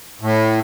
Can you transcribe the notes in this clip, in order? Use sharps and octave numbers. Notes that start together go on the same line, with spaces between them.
A2